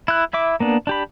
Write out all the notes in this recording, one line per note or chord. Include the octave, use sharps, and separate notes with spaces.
E4 F#6
E4 E5 D6
A#3 B3 D4
D4 G4 B5